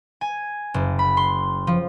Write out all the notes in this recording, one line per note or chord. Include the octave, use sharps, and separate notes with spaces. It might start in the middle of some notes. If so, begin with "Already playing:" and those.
G#5
F#1
B5
C6
F3